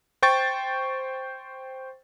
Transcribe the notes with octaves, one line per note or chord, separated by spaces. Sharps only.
C5 G5 C#6 A6